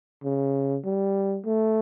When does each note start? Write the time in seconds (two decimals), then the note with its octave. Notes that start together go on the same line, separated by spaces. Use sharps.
0.24 C#3
0.85 G3
1.45 A3